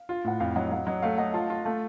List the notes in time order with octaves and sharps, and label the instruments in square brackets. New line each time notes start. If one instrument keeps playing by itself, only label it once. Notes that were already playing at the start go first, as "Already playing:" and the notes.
Already playing: [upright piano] F5
[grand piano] F4
[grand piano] A2 [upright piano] F#5
[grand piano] F2 [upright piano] F5
[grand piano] F#3 [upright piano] D#5 F#5
[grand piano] F#3 [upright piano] F5
[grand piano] F#3 [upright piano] D#5
[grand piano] A3 [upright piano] F5
[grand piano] A3 [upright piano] D#5 F#5
[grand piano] F4 [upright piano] F5 A5
[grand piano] F4
[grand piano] A3 [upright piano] F5 A5